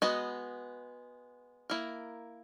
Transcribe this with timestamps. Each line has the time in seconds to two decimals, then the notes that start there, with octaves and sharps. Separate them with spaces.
0.02 G#3 B3 F#4 B4 D#5
1.70 A#3 E4 A#4